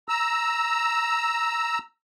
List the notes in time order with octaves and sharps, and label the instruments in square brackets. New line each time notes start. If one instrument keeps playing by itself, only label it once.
[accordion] A#5 E6